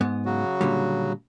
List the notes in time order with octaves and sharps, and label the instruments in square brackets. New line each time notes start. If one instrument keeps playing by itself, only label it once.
[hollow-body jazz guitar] G#2 B3
[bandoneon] C#3 F#3 F#4
[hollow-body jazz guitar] A#2 D3 G3